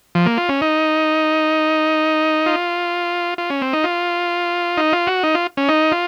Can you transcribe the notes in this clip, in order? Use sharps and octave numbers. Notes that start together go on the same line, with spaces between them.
F3
A#3
F4
C#4
D#4
F4
F4
C#4
C4
D#4
F4
D#4
F4
F#4
D#4
F4
C#4
D#4
F4